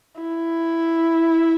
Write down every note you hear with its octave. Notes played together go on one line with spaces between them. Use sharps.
E4